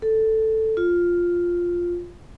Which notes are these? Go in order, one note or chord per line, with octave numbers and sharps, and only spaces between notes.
A4
F4